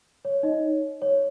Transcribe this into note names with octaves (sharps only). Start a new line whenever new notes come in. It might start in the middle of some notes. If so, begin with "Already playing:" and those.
C#5
D#4 D#5
C#5